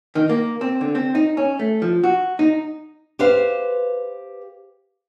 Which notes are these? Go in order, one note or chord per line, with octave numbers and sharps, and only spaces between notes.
D#3
A#3
C4
D3
C4
D#4
C#4
A3
F3
F#4
D#4
G4 B4 C5 E5 F5